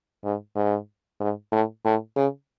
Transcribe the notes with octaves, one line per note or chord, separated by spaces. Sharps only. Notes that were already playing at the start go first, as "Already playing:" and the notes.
G#2
G#2
G#2
A2
A2
C#3